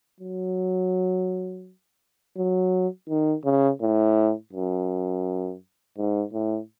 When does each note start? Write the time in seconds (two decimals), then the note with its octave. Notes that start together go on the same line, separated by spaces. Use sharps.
0.20 F#3
2.37 F#3
3.10 D#3
3.45 C#3
3.81 A2
4.53 F#2
5.98 G#2
6.33 A2